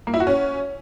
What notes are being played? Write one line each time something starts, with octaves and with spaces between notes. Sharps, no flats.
A#3
E4
F#4
C#4